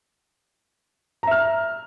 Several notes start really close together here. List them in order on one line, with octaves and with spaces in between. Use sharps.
A#5 E5 F6